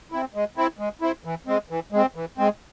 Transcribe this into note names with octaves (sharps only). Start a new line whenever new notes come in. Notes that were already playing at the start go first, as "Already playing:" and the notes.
C4 E4
G#3
C4 E4
G#3
C4 E4
E3
G#3 C4
E3
G#3 C4
E3
G#3 C4